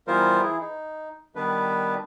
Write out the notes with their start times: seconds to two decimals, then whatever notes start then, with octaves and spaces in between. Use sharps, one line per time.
0.07 E3 G3 B3 F4 A#4 C5
0.41 E3 E4 G#4
0.59 D#4
1.35 D#3 G3 B3 D4 B4